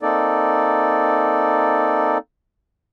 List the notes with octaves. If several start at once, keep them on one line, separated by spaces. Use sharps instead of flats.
A#3 C4 D#4 A4 D5